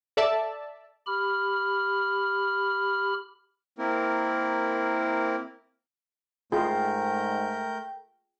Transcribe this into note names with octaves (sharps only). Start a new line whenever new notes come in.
A4 D5 E5 A5
G4 B5 F6
A#3 C4 E4 A#4
G#2 A3 F4 G#4 A#4 G5 G6